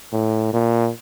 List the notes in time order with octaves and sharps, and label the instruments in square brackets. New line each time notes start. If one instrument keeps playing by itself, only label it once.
[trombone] A2
A#2